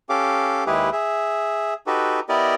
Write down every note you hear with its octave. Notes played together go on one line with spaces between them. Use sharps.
C#4 G4 A4 F5 D6
D#2 G#3 E4 G4 G#4 B4
G#4 E5
D#4 F#4 G4 A4 B4
B3 E4 G4 A#4 D5 D#5